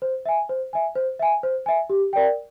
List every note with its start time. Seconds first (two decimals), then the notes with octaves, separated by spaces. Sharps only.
0.02 C5
0.26 E5 G#5
0.49 C5
0.73 E5 G#5
0.95 C5
1.20 E5 G#5
1.43 C5
1.66 E5 G#5
1.90 G4
2.13 A#4 D5 G5